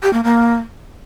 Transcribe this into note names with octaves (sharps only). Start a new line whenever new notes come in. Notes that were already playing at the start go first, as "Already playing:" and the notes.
G4
A#3
A#3